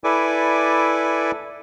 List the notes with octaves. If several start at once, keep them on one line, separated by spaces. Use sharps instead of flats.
E4 A4 B4 D5 G#5 D6